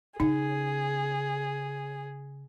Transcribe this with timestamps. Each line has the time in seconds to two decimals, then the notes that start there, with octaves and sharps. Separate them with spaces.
0.20 C#3 D#4 G#4